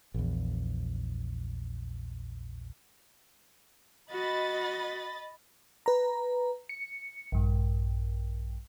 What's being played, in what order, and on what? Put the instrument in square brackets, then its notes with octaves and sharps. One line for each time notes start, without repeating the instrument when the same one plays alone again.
[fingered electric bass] A#1 E2
[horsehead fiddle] F#4 [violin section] D#5 B5 A6
[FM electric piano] B4 A#5
C#7
A#1 G2